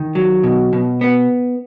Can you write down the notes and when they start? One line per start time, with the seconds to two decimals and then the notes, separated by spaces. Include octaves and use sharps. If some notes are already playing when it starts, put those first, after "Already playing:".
Already playing: D#3
0.15 F#3
0.44 B2
0.73 B2
1.01 B3